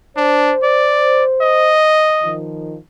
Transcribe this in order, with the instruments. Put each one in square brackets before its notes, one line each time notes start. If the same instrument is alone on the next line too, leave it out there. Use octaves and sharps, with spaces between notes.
[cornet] D4 [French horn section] C5
[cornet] D5
D#5
[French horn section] D#3 F3